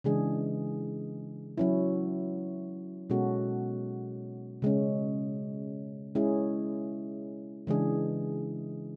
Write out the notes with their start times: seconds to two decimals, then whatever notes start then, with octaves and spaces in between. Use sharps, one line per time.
0.04 C#3 E3 G#3 D4 G#4
1.58 F#3 C#4 E4
3.10 B2 G#3 C#4 F#4 A4
4.62 C#3 G#3 C#4
6.15 G#3 C#4 E4 G#4
7.67 C#3 E3 G#3 D4 G#4